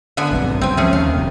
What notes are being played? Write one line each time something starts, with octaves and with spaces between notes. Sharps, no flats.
D3 B3 G#5
A#1 G2 C4
C#2 C4 G#5
F3 G#3 A3 C#4 G#4
D#2 F5
F#1 C3